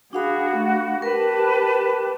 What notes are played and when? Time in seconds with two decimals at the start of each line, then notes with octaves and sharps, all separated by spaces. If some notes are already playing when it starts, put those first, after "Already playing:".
0.13 D4 F#4 G#4 F5 B5
0.57 A3
1.02 G4 A#4 B4 A5